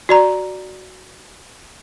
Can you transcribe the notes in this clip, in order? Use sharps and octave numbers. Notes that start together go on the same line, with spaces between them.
F#4 D5 A#5